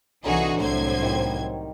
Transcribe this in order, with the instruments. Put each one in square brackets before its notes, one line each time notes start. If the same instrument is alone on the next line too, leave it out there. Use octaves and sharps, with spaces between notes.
[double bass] C2 E3 [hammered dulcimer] D3 C#5 A#5 [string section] D#4 F#4 G#4
[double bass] C2 F#3 [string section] A2 C5 G#6
[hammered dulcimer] D#3 G3